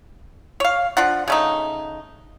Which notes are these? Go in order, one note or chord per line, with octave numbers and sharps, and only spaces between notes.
C#5 F5
F3 D4 F#5
C#3 A3 D#4